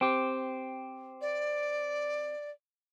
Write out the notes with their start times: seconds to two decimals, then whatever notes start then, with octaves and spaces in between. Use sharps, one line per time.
0.01 C4 G4
1.21 D5